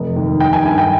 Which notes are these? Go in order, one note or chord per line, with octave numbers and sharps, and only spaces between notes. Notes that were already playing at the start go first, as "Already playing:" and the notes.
Already playing: F1
D#2
D#3 G5
G#5
G2 G#5
G5